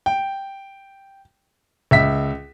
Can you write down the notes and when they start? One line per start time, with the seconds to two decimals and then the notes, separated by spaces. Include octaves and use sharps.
0.06 G5
1.91 C#2 E5 B6